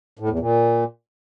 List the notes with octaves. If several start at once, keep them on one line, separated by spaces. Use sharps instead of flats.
A2
E2
A#2